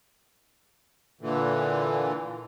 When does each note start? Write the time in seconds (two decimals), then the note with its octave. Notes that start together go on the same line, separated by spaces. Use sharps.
1.21 A#2 D3 E3